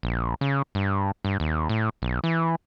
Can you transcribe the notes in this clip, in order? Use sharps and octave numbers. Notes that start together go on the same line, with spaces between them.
A#1
C#3
G2
G2
D#2
A2
B1
E3